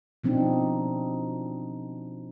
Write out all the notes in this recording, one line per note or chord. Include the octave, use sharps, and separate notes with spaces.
B2 F3 C4 D4 D#4